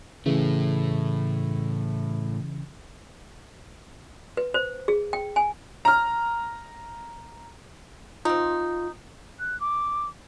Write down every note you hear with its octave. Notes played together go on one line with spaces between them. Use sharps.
A2 C#3 E3 A3
B4
C5
G#4
G5
G#5
A#5 F6
C4 D#4 F4
F#6
D6